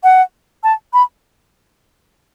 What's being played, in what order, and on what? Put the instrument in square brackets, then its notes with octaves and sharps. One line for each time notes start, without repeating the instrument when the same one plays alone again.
[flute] F#5
A5
B5